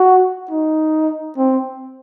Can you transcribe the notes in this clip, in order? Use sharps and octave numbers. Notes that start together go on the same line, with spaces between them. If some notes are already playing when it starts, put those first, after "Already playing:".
Already playing: F#4
D#4
C4